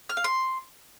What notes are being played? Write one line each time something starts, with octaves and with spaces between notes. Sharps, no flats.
F6
F5
C6